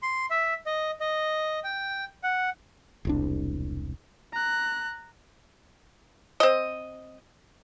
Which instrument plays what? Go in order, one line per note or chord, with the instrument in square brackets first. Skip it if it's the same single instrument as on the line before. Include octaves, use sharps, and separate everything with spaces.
[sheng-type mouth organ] C6
E5
D#5
D#5
G5
F#5
[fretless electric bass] E1 C2 D4
[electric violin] A#5 F#6
[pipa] C4 D#5